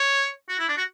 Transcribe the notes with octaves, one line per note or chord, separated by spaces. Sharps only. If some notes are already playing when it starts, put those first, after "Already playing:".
Already playing: C#5
F#4
E4
D4
F#4